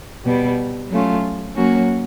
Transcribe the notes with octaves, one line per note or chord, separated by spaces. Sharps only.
B2 G3 B3
F#3 A3 C#4 F4
F#3 A#3 C#4 F#4